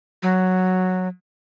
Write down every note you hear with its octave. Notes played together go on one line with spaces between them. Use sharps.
F#3